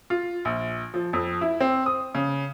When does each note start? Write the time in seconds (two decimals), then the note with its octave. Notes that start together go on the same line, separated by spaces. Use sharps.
0.10 F4
0.45 A#1
0.94 F3
1.13 F2
1.41 E4
1.61 C4
1.86 D#6
2.15 C#3